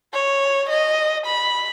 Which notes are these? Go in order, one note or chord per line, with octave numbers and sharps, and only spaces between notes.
C#5
D#5
B5